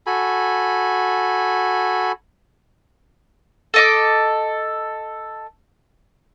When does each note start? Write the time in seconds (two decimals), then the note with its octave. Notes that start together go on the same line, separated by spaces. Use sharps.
0.07 F#4 A4 G#5 B5
3.74 A4 D#5 D6